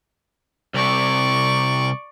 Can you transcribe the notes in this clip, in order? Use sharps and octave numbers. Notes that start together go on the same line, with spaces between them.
C2 C3 D5 C#6